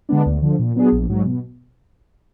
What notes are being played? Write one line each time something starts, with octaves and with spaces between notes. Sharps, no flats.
D3 G#3 B3 D4
D2
D3 F3
A#2
F#3 B3 D4 G#4
A#1
G#2 F#3
B2